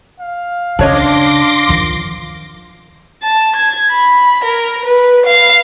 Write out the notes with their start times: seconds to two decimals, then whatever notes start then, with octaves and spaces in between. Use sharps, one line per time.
0.20 F5
0.79 C#3 D4 C#5 D#5 C6 D6 A#6
1.69 D#3 F3
3.22 A5
3.55 G#6
3.91 B5
4.42 A#4
4.84 B4
5.25 F5